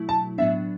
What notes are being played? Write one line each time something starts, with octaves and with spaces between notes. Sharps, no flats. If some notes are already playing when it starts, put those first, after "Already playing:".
Already playing: B2 F#3 A3 E4
A5
A2 F#3 B3 D4 E5